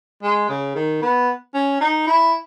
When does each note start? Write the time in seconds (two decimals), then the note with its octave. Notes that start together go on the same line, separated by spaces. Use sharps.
0.23 G#3
0.49 C#3
0.75 D#3
1.02 B3
1.54 C#4
1.80 D#4
2.07 E4